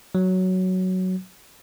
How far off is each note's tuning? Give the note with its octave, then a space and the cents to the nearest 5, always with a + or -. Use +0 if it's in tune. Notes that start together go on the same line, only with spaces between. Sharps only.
F#3 +5